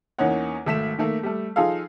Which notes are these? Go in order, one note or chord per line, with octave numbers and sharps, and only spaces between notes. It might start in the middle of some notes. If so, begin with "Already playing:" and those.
E2 A#3 C#4 D#4 C#5 F#5
G#1 A3 B6 E7
D#3 A3 A#3
G3 A3
F3 D#4 F4 G#4 A4 F5